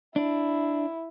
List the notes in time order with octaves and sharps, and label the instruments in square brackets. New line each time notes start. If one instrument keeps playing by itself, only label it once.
[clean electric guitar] D4 [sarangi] E4